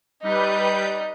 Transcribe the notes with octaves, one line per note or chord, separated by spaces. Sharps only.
G3 D#4 B4 G6